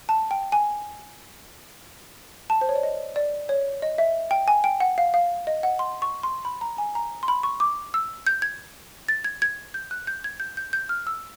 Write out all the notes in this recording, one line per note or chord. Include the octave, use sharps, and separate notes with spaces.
A5
G5
G#5
A5
C5
C#5
D5
D#5
D5
C#5
D#5
E5
G5
G#5
G5
F#5
F5
F5
D#5
F#5
C6
C#6
C6
B5
A#5
G#5
A#5
C6
B5
C#6
D6
E6
G6
G#6
A6
G#6
G#6
G6
F#6
G6
G#6
G6
G6
G6
F6
E6